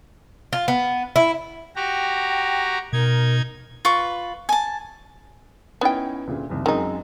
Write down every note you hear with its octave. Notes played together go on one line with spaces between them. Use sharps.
F4
B3
E4
F#4 G4 G5 A#5
B2 D#4 A#4 G#6
F4 B4 C#6
G#5 A5
B3 C#4 D#4 E4 G5
D2 A#2 C#3
F#1 C2 D#3
F#2 D#3 G#3 C4 D#4